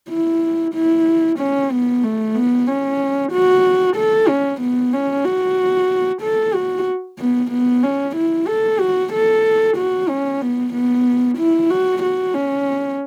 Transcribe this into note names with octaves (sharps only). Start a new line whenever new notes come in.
E4
E4
C#4
B3
A3
B3
C#4
F#4
A4
C#4
B3
C#4
F#4
A4
F#4
B3
B3
C#4
E4
A4
F#4
A4
F#4
C#4
B3
B3
E4
F#4
F#4
C#4